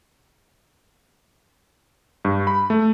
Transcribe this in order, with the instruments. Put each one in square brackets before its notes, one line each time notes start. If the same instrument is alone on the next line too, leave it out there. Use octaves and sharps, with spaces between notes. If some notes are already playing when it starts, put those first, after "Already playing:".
[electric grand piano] G2
B5
A3